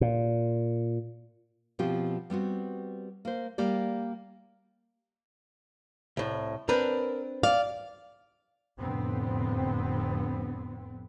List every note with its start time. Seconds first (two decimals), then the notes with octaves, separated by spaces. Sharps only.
0.01 A#2
1.79 B2 F3 C4 G4
2.30 G3 B3 C4 F#4
3.25 A#3 C5
3.58 G3 A#3 G4 D5
6.17 C2 A2
6.69 C4 D4 A#4 B4
7.43 D5 F5
8.78 F1 F2 A2 D3 B3 C4